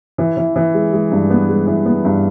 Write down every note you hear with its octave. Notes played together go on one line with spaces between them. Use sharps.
E3
E3
E3
G#3
G#3
G2
B3
G#3
E3
B3
G2